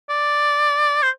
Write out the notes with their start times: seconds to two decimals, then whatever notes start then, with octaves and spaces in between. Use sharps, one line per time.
0.09 D5
1.03 C5